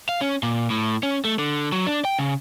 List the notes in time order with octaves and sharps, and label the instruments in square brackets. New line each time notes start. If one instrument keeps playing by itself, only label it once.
[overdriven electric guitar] F5
C#4
A#2
A2
C#4
A3
D3
F#3
D4
G5
C#3